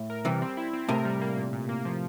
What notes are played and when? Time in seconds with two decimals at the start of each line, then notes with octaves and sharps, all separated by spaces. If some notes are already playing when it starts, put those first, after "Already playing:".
Already playing: A2
0.10 A#4
0.25 C3 E3 G3
0.42 C4
0.57 E4
0.73 C4
0.89 A2 C3 A#4
1.05 G3
1.21 A#3
1.37 A#2
1.53 A#2
1.69 A#3
1.85 F3